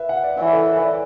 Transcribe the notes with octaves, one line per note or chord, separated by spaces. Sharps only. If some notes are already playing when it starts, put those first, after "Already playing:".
Already playing: B4 E5
F#5
D5
E3 C#5
A4
B4
D5